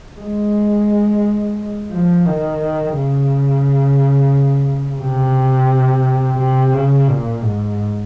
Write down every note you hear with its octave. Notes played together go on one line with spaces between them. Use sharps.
G#3
F3
D#3
C#3
C3
C3
C#3
A#2
G#2